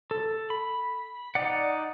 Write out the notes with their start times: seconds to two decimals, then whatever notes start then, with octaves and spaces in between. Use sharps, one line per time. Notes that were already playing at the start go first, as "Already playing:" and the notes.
0.11 A4
0.50 B5
1.35 D#4 D5 F#5